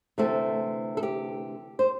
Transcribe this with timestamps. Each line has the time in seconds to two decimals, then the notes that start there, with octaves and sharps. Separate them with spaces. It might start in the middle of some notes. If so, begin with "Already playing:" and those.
0.18 D2 C3 E3 A3 C4 A4
0.97 A4
1.03 G4
1.79 C5